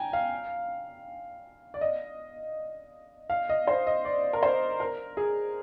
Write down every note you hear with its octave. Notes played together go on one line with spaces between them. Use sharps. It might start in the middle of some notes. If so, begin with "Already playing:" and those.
Already playing: G5 G#5 A#5
F5
D5
D#5
F5
D#5
C5
D#5
D5
A#4
C5
A#4
G#4